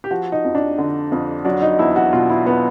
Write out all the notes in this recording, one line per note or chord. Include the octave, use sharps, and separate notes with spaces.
G4
F3 F#4
D#4
F2
D4
D3
F2
F#3 D4
D#4
E2 E4
F#4
B2 F4
E4
B3